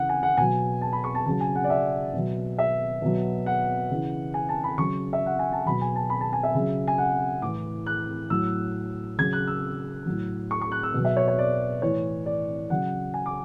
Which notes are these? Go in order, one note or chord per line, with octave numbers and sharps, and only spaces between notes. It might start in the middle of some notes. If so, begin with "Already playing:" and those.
Already playing: C#3 E3 F#5
G#5
F#5
B2 F#3 G#5
A5
B5
C#6
A5
C#3 F#3 A5
G#5
F#5
D5
E5
B2 F#3
E5
B2 F#3
F#5
C#3 E3
G#5
A5
B5
C#3 F#3 C#6
E5
F#5
G#5
A5
B2 F#3 B5
G#5
A5
B5
A5
G#5
E5
C#3 F#3
G#5
F#5
A2 E3 D6
F#6
A2 F#3 E6
C#3 F#3 G#6
F#6
E6
A2 F#3
C#6
C#6
F#6
E6
B2 F#3
E5
C#5
C#5
D5
A2 E3 C#5
D5
C#3 F#3 F#5
G#5
D6